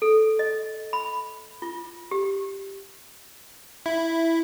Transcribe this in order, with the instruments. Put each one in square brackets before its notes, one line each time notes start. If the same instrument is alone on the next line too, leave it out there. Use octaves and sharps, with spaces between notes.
[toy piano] A4
D#5
B5
F4
G4
[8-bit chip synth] E4